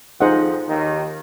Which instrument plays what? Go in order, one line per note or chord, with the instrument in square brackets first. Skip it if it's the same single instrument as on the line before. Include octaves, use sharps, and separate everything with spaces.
[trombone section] F2 F3 [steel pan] D#4 G#4 C5 D#5 F#5
[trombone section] D#2 D#3